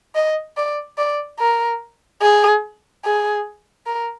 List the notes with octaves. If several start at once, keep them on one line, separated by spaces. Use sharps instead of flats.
D#5
D5
D5
A#4
G#4
G#4
A#4